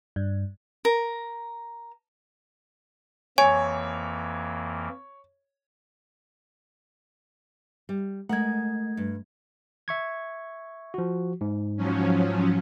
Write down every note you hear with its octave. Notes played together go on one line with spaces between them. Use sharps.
G2
A#4
F2 E3 A#3 C#5 G#5
G3
G#3 A3 A#4 F#5 G#6
G2
E5 C#6 G#6
F3 F#4
G#2
F3 F#3 C#4